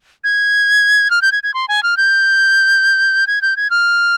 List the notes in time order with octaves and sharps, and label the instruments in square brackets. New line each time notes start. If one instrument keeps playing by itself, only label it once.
[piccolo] G#6
F6
G6
G#6
G#6
C6
G#5
F6
G6
G#6
G6
G#6
F6